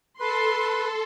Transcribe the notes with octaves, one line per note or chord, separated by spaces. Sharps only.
A4 B4 C6